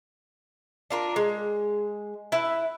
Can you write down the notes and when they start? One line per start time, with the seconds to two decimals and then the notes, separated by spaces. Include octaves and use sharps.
0.90 D4 F4 A#4
1.16 G#3
2.32 E4 B4